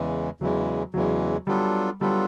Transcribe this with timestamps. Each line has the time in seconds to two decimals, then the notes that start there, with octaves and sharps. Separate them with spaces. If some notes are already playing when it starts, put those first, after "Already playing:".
Already playing: E2 C#3 E3 G#3
0.40 E2 C#3 E3 F#3 G#3
0.94 E2 C#3 E3 F#3 G#3
1.47 F#3 G3 B3 D4 F4 A4
2.01 F#3 G3 B3 D4 F4 A4